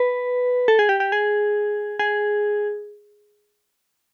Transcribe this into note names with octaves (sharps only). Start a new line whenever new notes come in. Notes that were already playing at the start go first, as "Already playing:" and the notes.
Already playing: B4
A4
G#4
G4
G4
G#4
G#4